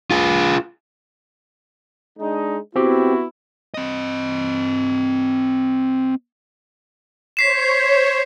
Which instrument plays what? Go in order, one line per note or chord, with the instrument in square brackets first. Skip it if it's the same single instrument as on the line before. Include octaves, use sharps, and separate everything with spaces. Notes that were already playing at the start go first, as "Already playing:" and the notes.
[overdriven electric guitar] F4 G#4
[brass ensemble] G#3 D4 D#4
[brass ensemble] B3 E4 [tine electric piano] C4 G4 [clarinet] F#4
[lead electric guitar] C4 D#5
[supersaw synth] C5 C#5 [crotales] B6 C7 E7